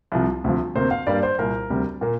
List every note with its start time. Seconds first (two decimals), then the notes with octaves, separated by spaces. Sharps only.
0.12 C2 C3 F3
0.44 D2 C3 F3
0.75 D2 C3 A#3 C5
0.91 F5
1.07 G2 G3 A#3 D5
1.23 C5
1.38 C2 A#2 A#3 A#4
1.70 D2 C3 G3
2.01 A#2 A#3